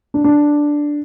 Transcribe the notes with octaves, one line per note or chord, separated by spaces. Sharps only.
D4
D4